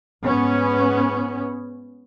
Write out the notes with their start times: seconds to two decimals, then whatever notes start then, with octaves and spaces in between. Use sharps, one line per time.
0.24 G#2 B3 C#4